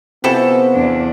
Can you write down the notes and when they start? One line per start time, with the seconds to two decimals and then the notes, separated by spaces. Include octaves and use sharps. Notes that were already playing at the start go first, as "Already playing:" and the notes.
0.24 C3 F3 B3 E4 F#4 A4 G#5
0.73 E2 D4